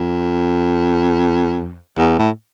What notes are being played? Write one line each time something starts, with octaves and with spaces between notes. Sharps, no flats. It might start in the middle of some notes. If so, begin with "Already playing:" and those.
Already playing: F2
E2
A2